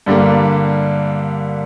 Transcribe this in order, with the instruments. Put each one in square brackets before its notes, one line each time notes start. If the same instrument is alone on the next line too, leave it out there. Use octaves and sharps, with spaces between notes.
[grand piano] G2 D3 G3 A#3